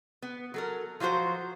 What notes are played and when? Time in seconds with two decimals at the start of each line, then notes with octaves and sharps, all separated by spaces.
0.22 B3
0.54 F#3 A4 A#4
1.00 F3 F#3 F4 F#4 C5